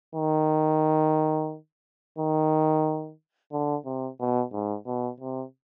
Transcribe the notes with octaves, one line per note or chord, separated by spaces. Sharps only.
D#3
D#3
D3
C3
B2
G#2
B2
C3